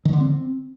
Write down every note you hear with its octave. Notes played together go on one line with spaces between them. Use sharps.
D#3
D3
C4